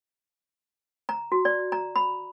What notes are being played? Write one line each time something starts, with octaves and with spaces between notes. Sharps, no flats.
A#5
F#4
D5
A#5
B5